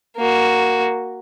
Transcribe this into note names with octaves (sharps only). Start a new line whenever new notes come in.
A#3 F#4